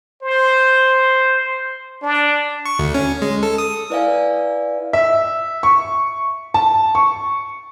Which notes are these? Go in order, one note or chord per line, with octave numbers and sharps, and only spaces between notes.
C5
D4
C#6
D2
C#4
G#3
A4
D#6
E4 B4 D5 E5 F5 G#5
E5
C#6
A5
C#6